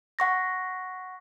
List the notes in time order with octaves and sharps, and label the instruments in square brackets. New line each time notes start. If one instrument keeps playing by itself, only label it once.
[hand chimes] F#5 C#6 A#6